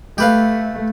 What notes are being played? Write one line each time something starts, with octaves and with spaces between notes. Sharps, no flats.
A3 G4 B4 F5